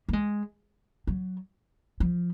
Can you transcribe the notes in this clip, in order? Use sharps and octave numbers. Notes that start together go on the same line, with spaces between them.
A#3
G#3
F#3
F3